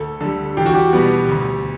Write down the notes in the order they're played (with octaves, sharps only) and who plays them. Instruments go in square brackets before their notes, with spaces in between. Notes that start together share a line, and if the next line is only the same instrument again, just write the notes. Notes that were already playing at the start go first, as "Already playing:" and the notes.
Already playing: [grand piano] D2 A4
D3 G3 A4
E2 G4
F#4
G4
B2 G3 B3
D2